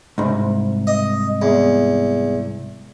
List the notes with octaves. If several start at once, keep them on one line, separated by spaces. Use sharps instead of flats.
C2 G#2
D#5
E2